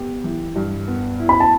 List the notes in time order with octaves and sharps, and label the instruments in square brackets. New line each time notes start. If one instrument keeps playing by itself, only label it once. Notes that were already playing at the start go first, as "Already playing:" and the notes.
Already playing: [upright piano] B3 G4
E3
G2
B3
E4
[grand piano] B5
A5